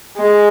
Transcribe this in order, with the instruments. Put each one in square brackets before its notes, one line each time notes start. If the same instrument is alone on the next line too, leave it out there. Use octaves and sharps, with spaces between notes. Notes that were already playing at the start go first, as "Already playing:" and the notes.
[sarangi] G#3